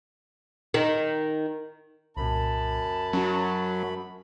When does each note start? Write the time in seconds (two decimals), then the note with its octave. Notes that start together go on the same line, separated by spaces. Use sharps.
0.74 D#3
2.17 C2 F#2 A#2 A5 B5
3.13 F#3 C#4 F#4